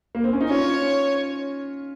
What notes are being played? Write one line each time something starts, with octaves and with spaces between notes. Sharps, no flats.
A#3
C4
C#4
D#4
C#4 F4 C#5